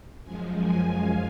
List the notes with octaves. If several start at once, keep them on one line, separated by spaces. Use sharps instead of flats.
F#2 F3 G#3 G#5
G#5
F5